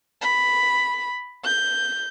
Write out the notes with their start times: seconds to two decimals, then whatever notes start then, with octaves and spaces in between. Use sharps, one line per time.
0.21 B5
1.44 G6